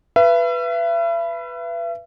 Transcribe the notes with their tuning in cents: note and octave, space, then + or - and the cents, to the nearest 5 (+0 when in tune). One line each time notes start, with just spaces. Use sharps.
B4 +0 E5 +40